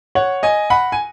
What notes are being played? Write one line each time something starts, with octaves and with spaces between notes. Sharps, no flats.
C#5 F#5
D#5 G#5
F#5 B5
G#5